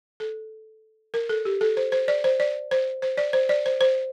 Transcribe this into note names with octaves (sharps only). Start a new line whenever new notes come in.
A4
A#4
A4
G4
A4
C5
C5
D5
C5
D5
C5
C5
D5
C5
D5
C5
C5